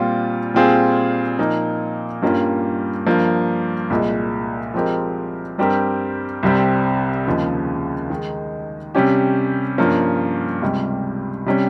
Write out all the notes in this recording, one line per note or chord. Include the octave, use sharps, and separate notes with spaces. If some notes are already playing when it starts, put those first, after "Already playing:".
Already playing: A#2 G3 C4 F4
A#2 G3 C4 F4 G#4
A#2 F3 A#3 D#4
G2 G3 A#3 C#4 F4
G2 F3 A#3
C2 A#2 G#3
F3 G#3 C4 G4 A#4
G2 G3 C4 G4 A#4
C2 C3 G3 C4
D#2 C#3 F3 G#3
D#3 G#3 D#4
C3 G3 C#4 G4
G2 F3 A#3 C#4
C#2 C3 G3
C3 G3 C#4